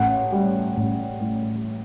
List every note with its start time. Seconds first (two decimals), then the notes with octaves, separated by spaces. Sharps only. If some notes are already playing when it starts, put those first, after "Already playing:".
Already playing: A1 F#5
0.32 G3
0.77 A1
1.21 A2